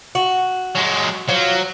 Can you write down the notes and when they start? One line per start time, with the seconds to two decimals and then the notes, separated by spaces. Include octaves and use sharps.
0.15 F#4
0.75 F#3 G#3
1.29 F3 F#3